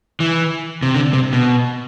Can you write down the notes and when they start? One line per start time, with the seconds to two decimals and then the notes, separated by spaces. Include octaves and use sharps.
0.20 E3
0.83 C3
0.95 D3
1.13 C3
1.33 B2